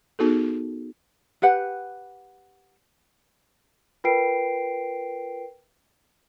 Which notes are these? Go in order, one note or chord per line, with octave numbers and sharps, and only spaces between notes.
B3 D#4 F#4 G#4 A4
G4 B4 F#5
F4 A#4 B4 G5 C7 D7